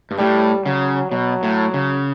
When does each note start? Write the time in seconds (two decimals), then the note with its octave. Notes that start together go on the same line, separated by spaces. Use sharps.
0.11 G2
0.18 A2 G3
0.65 C#3 F#3
1.11 B2 F#3
1.43 A2
1.74 C#3